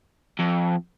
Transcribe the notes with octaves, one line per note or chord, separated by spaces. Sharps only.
F2